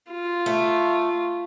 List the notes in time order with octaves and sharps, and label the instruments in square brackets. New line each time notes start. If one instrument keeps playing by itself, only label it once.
[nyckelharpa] F4
[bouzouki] A3